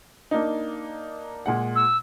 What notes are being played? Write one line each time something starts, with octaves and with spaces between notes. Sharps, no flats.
A#3 D4 D#4
A#2 G#3 F#5
E6